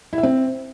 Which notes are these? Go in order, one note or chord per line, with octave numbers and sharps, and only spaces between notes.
E4
E5
C4